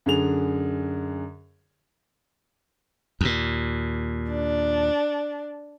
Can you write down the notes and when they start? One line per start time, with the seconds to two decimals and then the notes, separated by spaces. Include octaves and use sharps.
0.06 F#2 D3 G#4 F7
3.21 D#2 A#2
4.31 D4